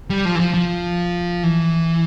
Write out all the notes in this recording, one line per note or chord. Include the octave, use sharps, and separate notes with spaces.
G3
F3
E3
F3
F3
E3